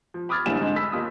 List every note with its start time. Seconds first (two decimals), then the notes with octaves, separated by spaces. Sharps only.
0.14 F3
0.29 B5 D6 D#6 F6 G#6 A6
0.46 F#1 D3 G3 E4 G#5 E7
0.59 G#2 D3 G#3 C4
0.76 B5 E6 B6
0.92 D#2 F4 D#6